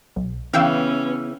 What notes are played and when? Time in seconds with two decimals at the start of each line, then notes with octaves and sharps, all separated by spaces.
0.16 B1
0.53 C#3 E3 B3 C#4 F5 G5 E6